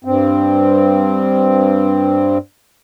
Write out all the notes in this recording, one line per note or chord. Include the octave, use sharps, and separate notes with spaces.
G2 C4